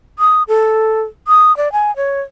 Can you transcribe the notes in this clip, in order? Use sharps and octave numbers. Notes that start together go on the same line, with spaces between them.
D#6
A4
D#6
D5
G#5
C#5